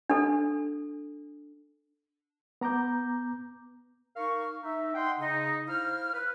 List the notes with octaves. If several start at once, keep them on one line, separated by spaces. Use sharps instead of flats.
D4 A4
B3 A#5 D6 G6
D#4 A#4 F5 C#6
D#4 E5
D#5 F#5 G5 C6
C#3 D#4
E4 C5 F5 F6
B4